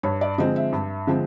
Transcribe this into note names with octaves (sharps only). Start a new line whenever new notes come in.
G2 C#5
D5
D3 F3 G#3 C4 D#5
E5
G2
D3 F3 G#3 C4